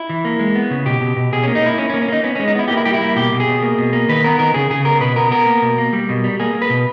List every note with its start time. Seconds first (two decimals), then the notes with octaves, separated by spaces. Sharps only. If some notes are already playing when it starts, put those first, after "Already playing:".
Already playing: E4
0.09 E3
0.25 A#3
0.39 G#3
0.55 B3
0.70 C#3
0.86 B2 G4
1.01 B2
1.16 B2
1.32 B2 G#4
1.43 A#3 C#4
1.55 D#4
1.62 A#3 E4
1.78 A#3 C#4
1.89 C#4
1.94 A#3
2.02 C#4
2.08 A#3 D#4
2.24 B3 C#4
2.35 G#3 C#4
2.48 D#4
2.55 B3 E4
2.68 A#3 G4
2.77 E4
2.85 G3 G4
2.94 E4
3.02 A#3
3.16 B2 G4
3.33 B2
3.40 G#4
3.47 B2
3.62 A#3
3.78 B2
3.93 A#3
4.09 D#3 B4
4.24 B3 A#4
4.39 D#3 A#4
4.54 C#3 G#4
4.70 C#3 G#4
4.85 B3 A#4
5.00 B2 B4
5.16 B3 A#4
5.31 B3 A#4
5.46 A#3
5.62 B2
5.78 A#3
5.93 G3
6.09 B2
6.24 G3
6.40 A#3 G#4
6.54 A#3
6.62 B4
6.70 B2